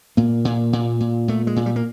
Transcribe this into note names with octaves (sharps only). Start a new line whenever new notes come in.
A#2 A#3
A#2
A#2
A#2
A#2 A3
G#3
A#2
G3
A#3